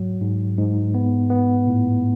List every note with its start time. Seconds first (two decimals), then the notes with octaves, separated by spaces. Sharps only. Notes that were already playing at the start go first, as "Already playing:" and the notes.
Already playing: G#2 F#3
0.21 G#2
0.58 G#2
0.94 B3
1.30 B3
1.67 A2